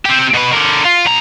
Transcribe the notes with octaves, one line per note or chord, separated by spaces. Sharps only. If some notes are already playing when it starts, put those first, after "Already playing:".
C4 G4
B2 B4
D3 A#4
F4
B2 A#5